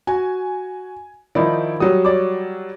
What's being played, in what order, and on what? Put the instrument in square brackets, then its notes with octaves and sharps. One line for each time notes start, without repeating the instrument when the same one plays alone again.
[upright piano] F#4 [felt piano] G#5
[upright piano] D#3 F3 [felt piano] D#4 E4 D5
[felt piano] F#3 G3 [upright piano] D#6
[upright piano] C#5 D5 D6